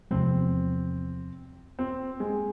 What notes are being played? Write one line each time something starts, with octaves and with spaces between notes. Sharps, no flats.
E2 C3 F3 G#3 C4
C4
G#3